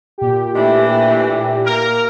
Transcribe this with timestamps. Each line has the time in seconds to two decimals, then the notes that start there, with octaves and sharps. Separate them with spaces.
0.18 A#2 G4
0.55 A2 E3 A3 D4
1.66 A#3 A#4